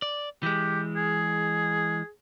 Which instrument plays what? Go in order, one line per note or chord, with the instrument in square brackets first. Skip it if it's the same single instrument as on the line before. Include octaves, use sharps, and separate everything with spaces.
[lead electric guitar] D5
[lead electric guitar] E3 G#3 [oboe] G4
[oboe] G#4